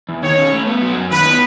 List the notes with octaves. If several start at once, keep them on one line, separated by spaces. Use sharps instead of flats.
E2
D#3 C#5
C#4
A3
B3
F#3
F#2
D#3 B4
B3